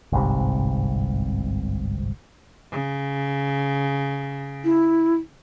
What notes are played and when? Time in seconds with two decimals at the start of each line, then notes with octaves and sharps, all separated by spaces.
0.12 G1 C2 G#2 C3
2.72 C#3
4.64 E4